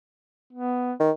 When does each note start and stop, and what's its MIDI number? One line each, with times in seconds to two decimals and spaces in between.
0.53 0.93 59
1.00 1.11 51